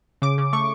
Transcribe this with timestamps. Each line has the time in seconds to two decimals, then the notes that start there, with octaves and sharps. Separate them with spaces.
0.22 C#3 D6
0.38 C#3
0.53 A3 C#6